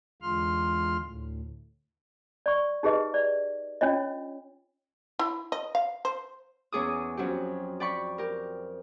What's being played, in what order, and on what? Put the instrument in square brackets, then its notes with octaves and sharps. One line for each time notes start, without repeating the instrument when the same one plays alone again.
[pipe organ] E2 D3 G#3 F4 C6 F6
D2 A2
[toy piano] D5 C#6
D#4 G4 G#4 B4 D#5
D5
C#4 D4 F4 C#5 D#5
[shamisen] E4
D#5
F5
C5
[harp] E2 C#4 G#4 D6 D#6
F2 F#3 C#4 G4
D5 G5 B5 C#6
G4 A#4